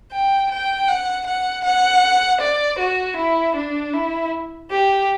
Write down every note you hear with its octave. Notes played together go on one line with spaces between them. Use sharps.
G5
G5
F#5
F#5
F#5
D5
F#4
E4
D4
E4
G4